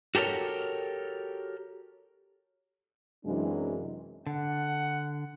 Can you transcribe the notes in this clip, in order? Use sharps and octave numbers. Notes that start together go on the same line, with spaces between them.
F#4 G4 A4 A#4 C#5
F#2 C3 E3 F#3 G#3 D4
D3 F#5